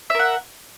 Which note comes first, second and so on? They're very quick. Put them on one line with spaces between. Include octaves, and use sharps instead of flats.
E5 A#4 F#5